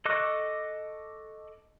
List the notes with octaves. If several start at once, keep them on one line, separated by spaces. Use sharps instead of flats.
A4 D#5 C#6 D6 F#6